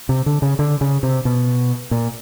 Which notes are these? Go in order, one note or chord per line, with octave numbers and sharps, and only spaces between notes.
C3
D3
C#3
D3
C#3
C3
B2
A#2